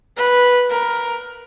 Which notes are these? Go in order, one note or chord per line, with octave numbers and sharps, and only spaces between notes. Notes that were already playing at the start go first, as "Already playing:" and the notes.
B4
A#4